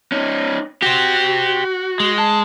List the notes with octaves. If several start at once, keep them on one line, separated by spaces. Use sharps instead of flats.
C#4 D#4
F#4 G4 C5
G#3
A5